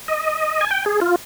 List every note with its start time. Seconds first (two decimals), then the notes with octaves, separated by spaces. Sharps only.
0.08 D#5
0.61 G#5
0.71 G5
0.86 G#4
1.01 F4